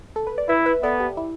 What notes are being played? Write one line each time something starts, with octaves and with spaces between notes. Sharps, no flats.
A4
B4
D5
E4 B4 E5
B4 E5
B3 A4 D5
G4
E4